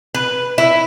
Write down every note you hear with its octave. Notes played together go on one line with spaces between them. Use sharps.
B4
E4